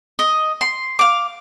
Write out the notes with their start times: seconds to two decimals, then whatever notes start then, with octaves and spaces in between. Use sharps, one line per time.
0.19 D#5
0.61 C6
0.99 F5 D6